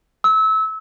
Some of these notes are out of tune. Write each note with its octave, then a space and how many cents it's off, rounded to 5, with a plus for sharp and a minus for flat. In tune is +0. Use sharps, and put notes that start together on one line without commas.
E6 -25